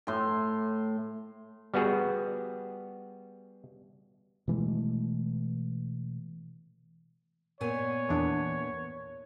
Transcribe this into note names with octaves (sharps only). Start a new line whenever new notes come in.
A2 C6
G3 B3 F#4 G#4
B2 E3 G#3 A3
A#2 B3 C#5 G#5
E2 E3 D4